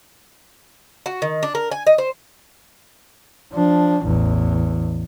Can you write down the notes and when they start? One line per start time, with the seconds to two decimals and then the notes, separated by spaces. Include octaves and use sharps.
1.06 F#4
1.22 D#3
1.43 D4
1.55 A#4
1.72 G#5
1.87 D#5
1.98 C5
3.52 F3 D4
4.04 A1 E2